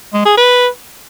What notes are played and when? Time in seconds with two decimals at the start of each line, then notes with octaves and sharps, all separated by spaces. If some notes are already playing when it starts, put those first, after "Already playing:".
0.13 G#3
0.25 G#4
0.37 B4